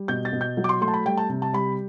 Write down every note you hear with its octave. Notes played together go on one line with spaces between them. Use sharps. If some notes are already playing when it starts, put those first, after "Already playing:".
Already playing: G3
B2 G6
A6
B2
G6
F#3
D6
C6
A3 C6
A5
B5
G3 G5
A5
C3
A5
G3 B5